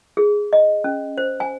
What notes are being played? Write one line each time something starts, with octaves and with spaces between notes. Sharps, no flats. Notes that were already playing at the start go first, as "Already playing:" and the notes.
G#4
D#5
C#4
C5
G#5